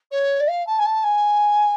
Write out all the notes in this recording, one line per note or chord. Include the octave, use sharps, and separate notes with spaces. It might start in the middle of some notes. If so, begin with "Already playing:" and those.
C#5
D5
F5
A5
G#5
A5
G#5